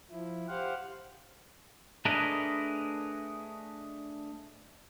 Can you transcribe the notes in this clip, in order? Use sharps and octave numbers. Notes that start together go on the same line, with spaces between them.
F3 E4
G4 C5 F5 F#5
A3 D4 G#4 A#4 B4 D#5